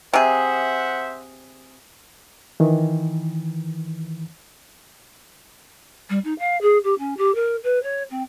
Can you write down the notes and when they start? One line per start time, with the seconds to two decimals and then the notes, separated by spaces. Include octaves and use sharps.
0.13 C3 G#4 C5 E5 F#5
2.60 D#3 E3
6.09 G3
6.24 D#4
6.39 F5
6.61 G#4
6.83 G4
6.98 C#4
7.17 G4
7.34 A#4
7.63 B4
7.83 C#5
8.10 C4